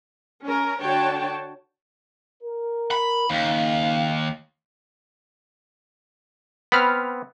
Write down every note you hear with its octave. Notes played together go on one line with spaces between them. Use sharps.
C#4 A#4
D3 D4 F#4 C#5 G5 A5
A#4
B5
D#2 C#3 D#4 F5
B3 C4 B5 F6